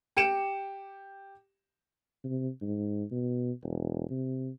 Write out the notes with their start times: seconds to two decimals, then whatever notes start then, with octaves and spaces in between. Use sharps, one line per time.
0.17 G4 C#7 D7 E7
2.24 C3
2.61 G#2
3.11 B2
3.63 E1
4.10 C3